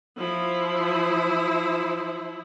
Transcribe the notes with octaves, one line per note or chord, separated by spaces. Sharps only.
F3 E4